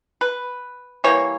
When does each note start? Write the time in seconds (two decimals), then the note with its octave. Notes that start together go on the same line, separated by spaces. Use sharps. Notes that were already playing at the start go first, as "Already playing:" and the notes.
0.21 B4
1.04 E3 G3 A#3 C#5